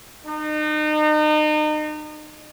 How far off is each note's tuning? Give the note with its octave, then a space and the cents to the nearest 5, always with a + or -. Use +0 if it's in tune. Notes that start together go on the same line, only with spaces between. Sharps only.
D#4 -35